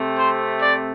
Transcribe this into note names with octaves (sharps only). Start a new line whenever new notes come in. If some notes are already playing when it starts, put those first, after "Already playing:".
Already playing: C3 A3 C4
C5
D5